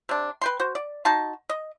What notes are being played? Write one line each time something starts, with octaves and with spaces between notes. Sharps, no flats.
C3 D4
B4 G5 C6
F#4 C5
D5
D#4 F#4 A5 C6
D#5